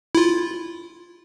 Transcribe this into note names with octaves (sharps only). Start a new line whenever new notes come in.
E4 F4